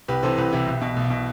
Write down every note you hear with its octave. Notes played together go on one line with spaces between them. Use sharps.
C2 G4 B4
C3 E3 A4 C5
C2 G4 B4
C3 E3 E4 G4
B1
B2
B1
B2